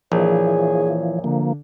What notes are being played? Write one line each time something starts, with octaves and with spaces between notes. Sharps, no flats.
A#1 E3 F3 G#4 C#5
D3 F3 A#3